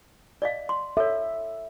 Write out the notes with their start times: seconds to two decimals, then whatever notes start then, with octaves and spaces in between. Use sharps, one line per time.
0.42 D5 D#5 F5
0.69 C6
0.97 A4 C#5 E5